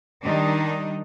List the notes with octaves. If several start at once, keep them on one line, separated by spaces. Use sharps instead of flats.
D#3 G3 D4 D#4